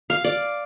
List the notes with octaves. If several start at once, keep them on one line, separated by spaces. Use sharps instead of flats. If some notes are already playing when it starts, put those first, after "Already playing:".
F5
D5